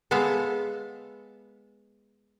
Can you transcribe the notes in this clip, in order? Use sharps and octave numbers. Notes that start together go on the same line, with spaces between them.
G#3 B3 A4 E5 F5